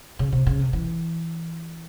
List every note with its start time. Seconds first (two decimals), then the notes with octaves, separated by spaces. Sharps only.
0.19 C#3
0.33 C3
0.47 C#3
0.59 C3
0.73 E3